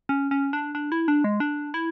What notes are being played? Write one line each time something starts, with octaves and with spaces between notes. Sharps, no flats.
C#4
C#4
D4
D4
E4
D4
G#3
D4
E4